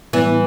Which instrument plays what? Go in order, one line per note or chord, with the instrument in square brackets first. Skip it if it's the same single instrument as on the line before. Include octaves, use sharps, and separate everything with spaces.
[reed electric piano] A2 G3 B3 E4 [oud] E3